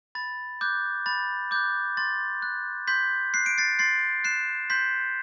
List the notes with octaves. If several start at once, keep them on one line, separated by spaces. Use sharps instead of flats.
B5 A6
D6 F#6 G6
B5 A6
D6 F#6 G6
C6 A6
F#6
C6 G6 B6
F#6 C7
D7
A6 C7
C6 A6 C7
F#6 C7 E7
C6 G6 B6